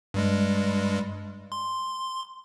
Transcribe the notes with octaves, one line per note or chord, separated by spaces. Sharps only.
G2 G3 G#3
C6